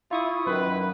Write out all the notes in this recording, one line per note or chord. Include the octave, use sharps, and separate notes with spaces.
E4 F4 C#6 D#6
F#2 D#3 B4